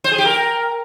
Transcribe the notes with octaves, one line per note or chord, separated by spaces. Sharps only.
C5
G#4
G4
A#4